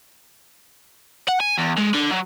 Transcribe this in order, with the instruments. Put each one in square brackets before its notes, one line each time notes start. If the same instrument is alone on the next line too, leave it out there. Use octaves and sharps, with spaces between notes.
[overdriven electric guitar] F#5
G#5
E2
G#3
D3
F#3